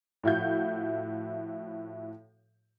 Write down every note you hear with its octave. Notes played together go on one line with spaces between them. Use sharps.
A2 F3 E4 F#4 F5 G6